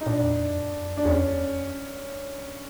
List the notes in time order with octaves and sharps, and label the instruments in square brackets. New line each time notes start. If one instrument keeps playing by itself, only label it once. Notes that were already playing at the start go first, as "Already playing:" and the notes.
[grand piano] D#4
[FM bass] A#2 [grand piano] D4
[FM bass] E2
F2
F#2
[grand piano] D4
[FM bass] E2 [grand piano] C#4
[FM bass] F2
F#2